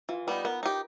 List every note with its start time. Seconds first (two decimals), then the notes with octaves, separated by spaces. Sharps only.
0.09 E3 F4
0.27 G3 B3 D#4 B4
0.45 B3 A#4
0.63 D#4 G4